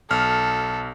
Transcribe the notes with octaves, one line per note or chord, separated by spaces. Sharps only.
B1 A4 F6